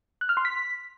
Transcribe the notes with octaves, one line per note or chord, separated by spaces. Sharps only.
F#6
F6
C6
B6